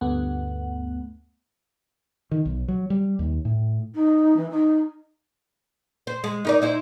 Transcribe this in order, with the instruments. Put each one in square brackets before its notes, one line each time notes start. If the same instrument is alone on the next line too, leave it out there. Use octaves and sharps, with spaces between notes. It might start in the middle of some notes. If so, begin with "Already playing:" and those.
[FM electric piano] D2 G2 A3 B3 F#5
[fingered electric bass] D#3
B1
F#3
G3
D#2
A2
[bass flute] D#4
E3
D#4
[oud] C5
G#3
D#4 A#4 D5
D#4 E4 C5